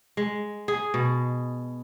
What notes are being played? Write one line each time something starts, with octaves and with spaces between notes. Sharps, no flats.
G#3
G#4
B2